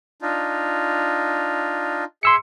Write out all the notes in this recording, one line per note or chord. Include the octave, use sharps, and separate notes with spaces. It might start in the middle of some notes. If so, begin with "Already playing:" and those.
D4 D#4 F4
G#4 E5 C6 E6 C#7